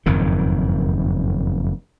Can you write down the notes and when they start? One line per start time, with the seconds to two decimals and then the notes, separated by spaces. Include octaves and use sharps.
0.06 F#1 F2 G#2 D#3